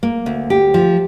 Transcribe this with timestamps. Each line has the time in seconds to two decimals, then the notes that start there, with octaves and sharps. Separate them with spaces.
0.03 A#3
0.26 D2
0.50 G4
0.74 F3